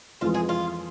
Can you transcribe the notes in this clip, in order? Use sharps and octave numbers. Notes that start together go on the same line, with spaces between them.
F2 E3 G#3 F4
G#4
F4